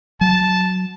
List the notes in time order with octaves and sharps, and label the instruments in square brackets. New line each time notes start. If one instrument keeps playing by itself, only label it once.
[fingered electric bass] F#3 [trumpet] A5